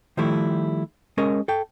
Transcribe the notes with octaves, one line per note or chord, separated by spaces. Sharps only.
D#3 F3 G3 A3 E4
G#3 C#4 A#4 D#5
A4 G5